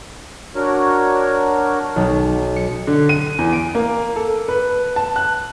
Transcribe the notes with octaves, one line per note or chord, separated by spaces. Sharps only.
D4 F#4 A#4 C#5
B1
C#7
D3
D#7
E2
D7
A#3
A4
B4
A5
F#6